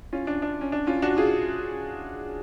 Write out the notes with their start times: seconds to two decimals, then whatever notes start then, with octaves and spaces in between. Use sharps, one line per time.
0.13 C#4 F4
0.27 D4
0.42 D4
0.61 C#4
0.72 D4
0.87 C#4 F4
1.02 D4 F#4
1.17 F4 G#4